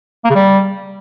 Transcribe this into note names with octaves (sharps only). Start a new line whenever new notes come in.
A#3
C#3
G3